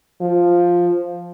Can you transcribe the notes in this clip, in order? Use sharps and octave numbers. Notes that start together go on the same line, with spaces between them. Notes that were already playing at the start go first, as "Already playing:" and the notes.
F3